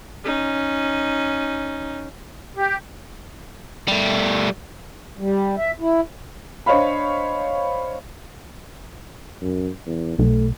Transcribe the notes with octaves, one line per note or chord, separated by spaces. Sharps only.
C#4 D#4
G4
G3 A3
G3
E5
E4
D4 C5 C#5 D#5 F5 B5
F#2
E2
B1 A3